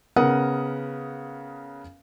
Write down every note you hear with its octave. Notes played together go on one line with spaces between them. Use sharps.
C#3 B3 A#4 F#5 D#6